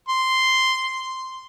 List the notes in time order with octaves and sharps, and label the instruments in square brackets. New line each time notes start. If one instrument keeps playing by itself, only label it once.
[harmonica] C6